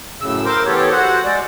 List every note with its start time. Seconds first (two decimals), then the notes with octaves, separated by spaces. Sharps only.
0.21 F#2 A2 C#3 E6
0.46 A#4 C5 C6 D6
0.66 E3 B3 G4 A4 C#5
0.91 F#4 C5 F#5
1.24 G#3 D5